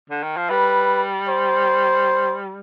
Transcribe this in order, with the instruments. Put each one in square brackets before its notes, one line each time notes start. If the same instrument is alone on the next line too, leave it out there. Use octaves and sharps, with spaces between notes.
[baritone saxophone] D3
D#3
F3
[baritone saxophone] G3 [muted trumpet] B4
[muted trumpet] C5